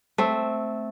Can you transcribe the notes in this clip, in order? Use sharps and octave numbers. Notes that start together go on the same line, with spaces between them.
A3 C4